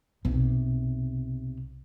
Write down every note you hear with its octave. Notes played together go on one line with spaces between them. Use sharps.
B1 C3